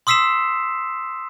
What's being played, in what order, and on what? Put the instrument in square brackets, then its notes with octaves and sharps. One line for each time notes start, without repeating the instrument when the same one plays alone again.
[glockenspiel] C6 D#6 E6 B6 C7 E7